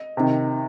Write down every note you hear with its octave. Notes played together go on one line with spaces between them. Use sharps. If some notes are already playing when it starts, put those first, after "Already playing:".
Already playing: D#5
C3 D#3